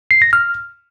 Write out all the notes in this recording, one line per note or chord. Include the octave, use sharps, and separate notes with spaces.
C7
A#6
F6